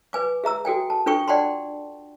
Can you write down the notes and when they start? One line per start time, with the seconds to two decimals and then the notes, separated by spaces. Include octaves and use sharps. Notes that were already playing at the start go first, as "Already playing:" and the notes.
0.13 B4 G#5 D6
0.44 G#4 E5 A#5 E6
0.65 F#4 A4 G5 G#5
0.90 A5
1.06 D4 F4 A4 G5 C#6
1.28 D5 F#5 G5 A5 B5 C6